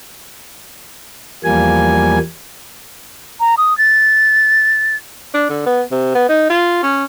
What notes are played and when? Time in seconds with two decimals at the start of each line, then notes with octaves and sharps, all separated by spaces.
1.44 E2 F3 G3 A#3 G#5
3.40 A#5
3.58 D#6
3.78 A6
5.34 D4
5.50 D3
5.66 B3
5.91 C3
6.15 B3
6.29 D#4
6.50 F4
6.83 C#4